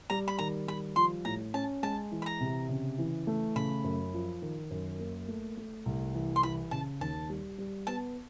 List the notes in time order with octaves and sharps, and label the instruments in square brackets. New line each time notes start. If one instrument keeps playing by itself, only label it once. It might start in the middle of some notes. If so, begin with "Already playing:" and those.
[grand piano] G3 [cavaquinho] A#5
[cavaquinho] B5
[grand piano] D#3 [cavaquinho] A#5
[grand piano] G3 [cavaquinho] B5
[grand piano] F3 [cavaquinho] C6
[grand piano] A2 [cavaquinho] A#5
[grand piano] C#4 [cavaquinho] A5
[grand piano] G#3 [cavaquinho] A5
[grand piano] E3
[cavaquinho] B5
A#5
[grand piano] C3
C#3
E3
A3
[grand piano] C#3 [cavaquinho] B5
[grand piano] F#2
F3
D#3
F#2
A#3
A3
A3
C2
E3
[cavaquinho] C6
[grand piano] E3 [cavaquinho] B5
[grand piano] C#3 [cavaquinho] A5
[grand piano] D#2 [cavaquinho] A5
[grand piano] G3
G3
[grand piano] B3 [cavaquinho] A5